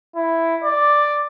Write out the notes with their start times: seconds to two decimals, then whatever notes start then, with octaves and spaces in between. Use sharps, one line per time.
0.16 E4
0.64 D5